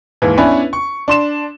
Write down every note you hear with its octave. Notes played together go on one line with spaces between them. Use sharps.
D#2 G#2 E3
B3 C#4 D4 E4 B4
C#6
D4 C6 E7